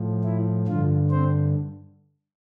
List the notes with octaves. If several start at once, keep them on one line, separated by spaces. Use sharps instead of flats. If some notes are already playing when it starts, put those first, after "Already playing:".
Already playing: A2 F3
E4
G2 D3 F3 F4
C4 C5